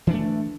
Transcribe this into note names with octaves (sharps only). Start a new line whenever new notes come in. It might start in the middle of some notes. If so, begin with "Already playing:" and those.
E3 A3 D4